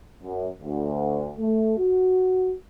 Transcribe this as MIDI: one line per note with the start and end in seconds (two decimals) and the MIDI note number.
0.23 0.48 42
0.61 1.31 38
1.39 1.76 57
1.78 2.53 66